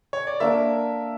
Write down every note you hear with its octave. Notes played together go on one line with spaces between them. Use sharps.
C#5
D5
A#3 D4 A#4 E5